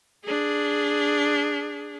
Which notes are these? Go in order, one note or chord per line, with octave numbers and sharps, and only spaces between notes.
D4 G#4